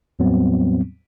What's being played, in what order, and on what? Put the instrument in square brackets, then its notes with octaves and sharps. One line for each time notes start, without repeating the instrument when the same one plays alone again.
[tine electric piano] E2 A2 F#3 G3 B3 C4